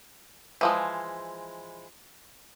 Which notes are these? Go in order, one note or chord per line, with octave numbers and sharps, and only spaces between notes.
E3 F3 G#3